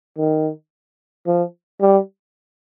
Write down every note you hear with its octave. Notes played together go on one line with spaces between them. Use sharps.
D#3
F3
G3